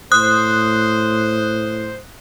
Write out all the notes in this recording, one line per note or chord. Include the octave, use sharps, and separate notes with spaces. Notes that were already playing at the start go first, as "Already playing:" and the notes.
A2 C5 D#6 F#6